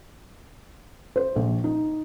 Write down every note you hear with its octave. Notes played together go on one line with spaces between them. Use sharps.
C5
A#1
D#4